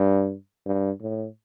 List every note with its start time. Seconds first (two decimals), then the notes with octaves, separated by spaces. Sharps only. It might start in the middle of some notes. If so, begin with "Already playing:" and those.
Already playing: G2
0.66 G2
1.02 A2